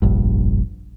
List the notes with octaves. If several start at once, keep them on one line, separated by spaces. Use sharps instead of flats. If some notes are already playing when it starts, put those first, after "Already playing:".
F1 A#1 G2